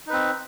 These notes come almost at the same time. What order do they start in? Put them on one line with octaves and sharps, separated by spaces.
D#4 B4 C4